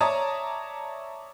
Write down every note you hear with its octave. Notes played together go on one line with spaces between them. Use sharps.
C#5 D5 E5 A5 A#5 D#6